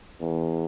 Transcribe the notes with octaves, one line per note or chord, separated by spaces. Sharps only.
E2